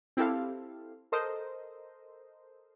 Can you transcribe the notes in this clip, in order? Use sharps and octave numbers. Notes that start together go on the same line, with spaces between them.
C4 E4 G4 A4 F5
A4 A#4 C5 D#5